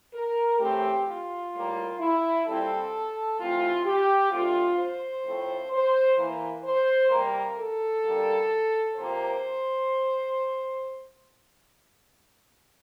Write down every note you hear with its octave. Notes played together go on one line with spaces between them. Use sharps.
A#4
A2 E3 A3 C4 G4
F4
A2 G3 A#3
E4
A#2 G3 C4 A4
C3 E3 A3 C4 F4
G4
D3 A3 C4 F4
C5
A2 F3 A3 C4
C5
E3 A#3
C5
C3 G3 A#3 A#4
A4
D3 G3 A#3
C3 F3 A#3 C5